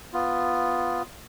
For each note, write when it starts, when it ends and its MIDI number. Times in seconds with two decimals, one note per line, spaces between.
0.13 1.02 59
0.13 1.02 65